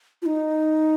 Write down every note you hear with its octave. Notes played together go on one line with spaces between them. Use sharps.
F4
D#4